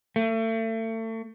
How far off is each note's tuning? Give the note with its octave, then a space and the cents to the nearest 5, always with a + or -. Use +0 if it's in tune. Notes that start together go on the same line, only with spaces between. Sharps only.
A3 +35